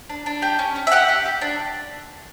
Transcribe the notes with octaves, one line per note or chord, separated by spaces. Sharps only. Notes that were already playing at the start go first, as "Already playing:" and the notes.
D4
D4
G4 G5
C#4
C#4
E5
G4 F#5
G4
G4
D4